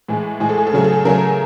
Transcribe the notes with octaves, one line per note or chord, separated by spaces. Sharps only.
A2 E3 G#3
A2 E3 G#3 G#4
A4
G#4
A4
C#3 F#3 A3 G#4
A4
G#4
C#3 F#3 A3 A#4